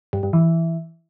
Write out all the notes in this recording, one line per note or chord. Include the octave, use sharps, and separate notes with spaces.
G2
G2
E3